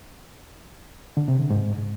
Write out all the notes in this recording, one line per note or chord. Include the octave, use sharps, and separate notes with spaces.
D3
C3
D3
G#2